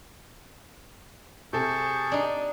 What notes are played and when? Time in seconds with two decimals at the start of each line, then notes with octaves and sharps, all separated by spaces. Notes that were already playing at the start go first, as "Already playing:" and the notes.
1.53 C3 G#4 A4 A5 C#6 G6
2.12 D4 D#4